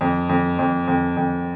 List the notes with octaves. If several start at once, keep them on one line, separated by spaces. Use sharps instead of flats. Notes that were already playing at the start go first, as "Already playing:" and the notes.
F2
F2
F2
F2
F2